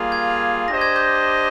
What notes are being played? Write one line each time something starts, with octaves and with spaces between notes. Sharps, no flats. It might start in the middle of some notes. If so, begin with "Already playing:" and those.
Already playing: G3 A#3 F4 G#4
G#6
D4 G4 C5 D#5 A#6
G#6
G6